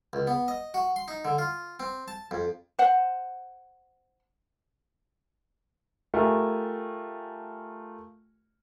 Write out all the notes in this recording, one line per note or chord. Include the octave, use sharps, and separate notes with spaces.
C#2
B3
D#5
F#4
C6
D#4
D3
F4
C4
A5
F2
C5 F#5
A3 F4 G4 A#4 G#5